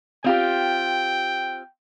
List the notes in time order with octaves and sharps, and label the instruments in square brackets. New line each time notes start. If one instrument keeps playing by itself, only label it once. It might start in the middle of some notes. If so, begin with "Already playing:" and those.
[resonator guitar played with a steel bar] C4 F4 G4 [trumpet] G5